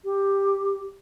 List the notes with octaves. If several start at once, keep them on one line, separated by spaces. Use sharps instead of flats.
G4